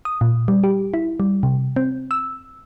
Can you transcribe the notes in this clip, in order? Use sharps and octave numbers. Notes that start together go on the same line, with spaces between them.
D#6
A#2
G3
G4
E4
G3
C3
C4
E6